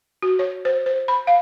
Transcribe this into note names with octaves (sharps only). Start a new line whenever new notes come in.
F#4
C#5
C5
C5
B5
F5